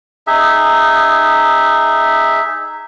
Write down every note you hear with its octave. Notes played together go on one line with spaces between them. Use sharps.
D#4 G#4 E5